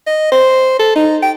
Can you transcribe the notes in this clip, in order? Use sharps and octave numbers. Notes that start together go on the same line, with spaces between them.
D#5
C5
A4
D#4
G5